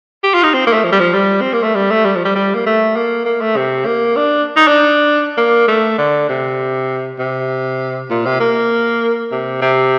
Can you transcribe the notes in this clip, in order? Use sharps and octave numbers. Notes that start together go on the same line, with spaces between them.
G4
F4
D#4
C4
A#3
A3
F3
G3
F3
G3
C4
A#3
A3
G3
A3
G3
F3
G3
G3
A#3
A3
A#3
A#3
A3
C3
A#3
D4
D#4
D4
A#3
A3
D3
C3
C3
A#2
C3
A#3
C3
C3